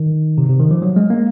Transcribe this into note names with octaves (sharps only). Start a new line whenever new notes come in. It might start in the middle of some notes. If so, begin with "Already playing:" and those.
Already playing: D#3
C3
C3
D#3
F3
F#3
G#3
A#3